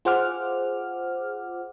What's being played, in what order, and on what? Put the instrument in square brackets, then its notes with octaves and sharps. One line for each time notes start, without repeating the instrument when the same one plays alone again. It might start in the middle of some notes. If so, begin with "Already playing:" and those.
[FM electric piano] F4 G#4 C5 F#5 D6 F6